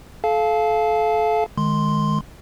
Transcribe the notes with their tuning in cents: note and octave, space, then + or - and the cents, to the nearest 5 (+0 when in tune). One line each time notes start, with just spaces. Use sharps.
A4 -30 F5 -5 A5 -30
D#3 -30 G#3 +10 C6 +0